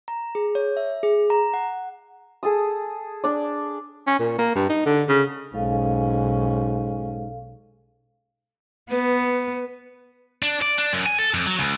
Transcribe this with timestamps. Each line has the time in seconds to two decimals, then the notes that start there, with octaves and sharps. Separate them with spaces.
0.08 A#5
0.35 G#4
0.55 C#5
0.77 E5
1.03 G#4
1.30 A#5
1.54 F#5
2.43 G#4 A4 D#6
3.24 D4 D5
4.07 C#4
4.19 A#2
4.38 A#3
4.56 G2
4.69 D#4
4.86 D3
5.09 C#3
5.54 B1 G#2 C#4 A4 F5
8.90 B3 B4
10.43 D4
10.62 D5
10.78 D4
10.93 F#2
11.06 G#5
11.19 A4
11.34 F2
11.47 F#3
11.59 C#2